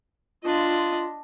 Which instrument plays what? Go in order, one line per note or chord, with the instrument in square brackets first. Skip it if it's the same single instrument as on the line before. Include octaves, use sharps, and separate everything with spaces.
[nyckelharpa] D4 D#5 [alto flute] F4